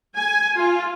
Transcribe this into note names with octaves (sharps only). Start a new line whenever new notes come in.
G#5
F4